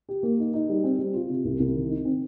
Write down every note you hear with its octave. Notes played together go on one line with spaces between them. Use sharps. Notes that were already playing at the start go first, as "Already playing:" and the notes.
G4
A#3
D#4
D#4
G3
C4
G3
F4
C3
C2
C2
D#3
D#4
C4